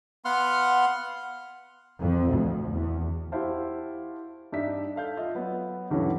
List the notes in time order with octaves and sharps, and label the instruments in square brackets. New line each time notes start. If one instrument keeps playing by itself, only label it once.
[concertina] B3 F5 F#5 C6 F6
[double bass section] F2
D2
E2
[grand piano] E4 F#4 G4 C5 F5 A5
G2 D4 D#4 E5 B6
A4 F5 G6
F4 D#5 E5
F#3 B3
D2 G2 C#3 E3 F#3